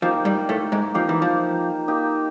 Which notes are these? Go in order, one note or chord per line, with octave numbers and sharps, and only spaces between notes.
F3 A#3 D#4 G4
G2 G3
A2 A3
G#2 G#3
F3 A#3 D#4 G4
E3
F3
A#3 D#4 G4